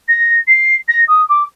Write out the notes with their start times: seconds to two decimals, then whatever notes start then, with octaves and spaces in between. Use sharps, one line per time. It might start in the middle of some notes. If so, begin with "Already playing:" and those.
0.08 A#6
0.47 C7
0.88 A#6
1.07 D#6
1.28 D6